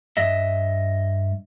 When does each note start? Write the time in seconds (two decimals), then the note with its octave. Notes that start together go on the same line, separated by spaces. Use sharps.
0.17 G2 D#5 E5